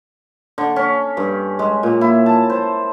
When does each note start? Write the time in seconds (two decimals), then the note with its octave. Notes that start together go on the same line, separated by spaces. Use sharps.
0.58 D3
0.76 C#4
1.17 G2
1.59 G#3
1.83 A#2
2.01 E4
2.26 A5
2.50 C5